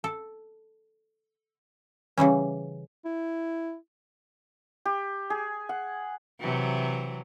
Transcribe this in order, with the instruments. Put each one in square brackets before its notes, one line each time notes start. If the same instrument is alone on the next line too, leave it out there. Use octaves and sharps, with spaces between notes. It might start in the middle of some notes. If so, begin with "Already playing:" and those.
[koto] A4
C#3 E3 G3 C#4
[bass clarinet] E4
[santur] G4
G#4
F#5
[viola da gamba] C3 E3 F#3